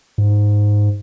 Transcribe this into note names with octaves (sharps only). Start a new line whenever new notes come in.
G#2